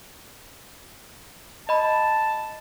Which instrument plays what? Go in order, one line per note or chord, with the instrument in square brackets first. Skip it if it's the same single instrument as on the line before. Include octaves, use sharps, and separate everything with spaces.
[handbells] D#5 B5 [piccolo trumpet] A5